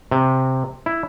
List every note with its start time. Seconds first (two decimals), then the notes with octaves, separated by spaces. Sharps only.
0.11 C3
0.86 E4